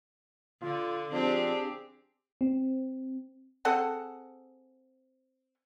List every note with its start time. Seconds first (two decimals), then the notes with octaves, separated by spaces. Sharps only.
0.62 D3 F4
1.12 F3 C4 D4 G4 G#4
2.41 C4
3.65 C4 G#4 A4 F#5